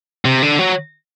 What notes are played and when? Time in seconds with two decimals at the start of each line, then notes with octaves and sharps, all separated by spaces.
0.25 C3
0.43 D3
0.59 F#3